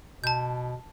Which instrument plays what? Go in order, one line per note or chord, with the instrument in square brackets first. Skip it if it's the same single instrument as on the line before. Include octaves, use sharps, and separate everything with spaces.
[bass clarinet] B2 [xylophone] A5 G6